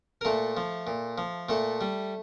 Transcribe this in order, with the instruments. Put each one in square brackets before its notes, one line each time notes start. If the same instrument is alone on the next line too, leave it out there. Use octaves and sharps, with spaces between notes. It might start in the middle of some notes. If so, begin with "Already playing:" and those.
[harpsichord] A#4
A#2 A3 A4
F3
A#2
F3
A#2 A3 A4
G3